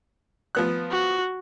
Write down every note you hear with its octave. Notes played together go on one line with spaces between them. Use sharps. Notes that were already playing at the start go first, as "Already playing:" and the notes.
F3 B3 F#6
F#4